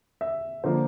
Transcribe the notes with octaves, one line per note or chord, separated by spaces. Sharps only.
E5
D3 F3 A#3 C5